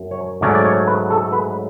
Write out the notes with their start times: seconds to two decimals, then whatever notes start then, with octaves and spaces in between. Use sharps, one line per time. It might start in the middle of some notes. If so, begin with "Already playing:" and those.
Already playing: F#2
0.11 C#5
0.41 G#2 F#3 A3 C#4 D5
0.55 D5
0.65 C#5
0.87 B4
1.10 A4
1.32 B4